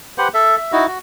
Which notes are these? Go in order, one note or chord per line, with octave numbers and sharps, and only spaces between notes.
G4 B4 C5 F#5
A4 E5
E5
D#4 E4 F#4
F#4